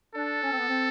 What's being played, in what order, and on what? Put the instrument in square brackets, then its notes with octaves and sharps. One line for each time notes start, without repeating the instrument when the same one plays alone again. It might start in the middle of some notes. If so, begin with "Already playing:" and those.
[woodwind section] D4 [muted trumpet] A4
[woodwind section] C#4
C4
B3
C4